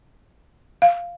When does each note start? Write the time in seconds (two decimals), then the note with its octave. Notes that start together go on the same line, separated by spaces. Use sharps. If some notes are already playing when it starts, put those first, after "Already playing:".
0.82 F5